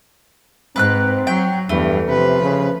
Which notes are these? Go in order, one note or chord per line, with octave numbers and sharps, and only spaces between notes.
G#2 C4 B4 F6 F#6
F#3 G5
E2 G2 E3 A3
C3 F3 B4
C#3